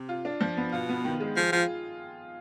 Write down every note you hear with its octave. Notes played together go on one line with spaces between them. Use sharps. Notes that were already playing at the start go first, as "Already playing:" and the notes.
Already playing: C3
F4
D4
F3
B3
B2 F4
B3
D#3
G#3
F3 G#4
F3 F4